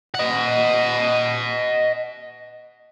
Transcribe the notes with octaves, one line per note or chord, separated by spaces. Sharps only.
D#5 F#5